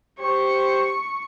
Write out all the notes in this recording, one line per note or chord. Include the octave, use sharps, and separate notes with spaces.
G4 C5 C#6